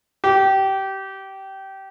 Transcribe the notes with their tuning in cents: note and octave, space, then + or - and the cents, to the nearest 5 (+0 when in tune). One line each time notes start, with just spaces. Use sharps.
G4 -20